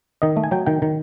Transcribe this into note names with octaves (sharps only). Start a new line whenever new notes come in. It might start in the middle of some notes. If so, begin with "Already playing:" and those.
D#3 D#5
A3
G#5
F#3 G5
D#3 G5
D#3